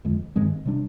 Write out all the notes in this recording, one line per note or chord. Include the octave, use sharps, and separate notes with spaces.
F2 D3 G#3
G2 D#3 G#3 C4
C3 G3 D4